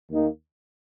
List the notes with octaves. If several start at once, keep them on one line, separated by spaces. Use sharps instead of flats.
D#2 D#3 A#3 D#4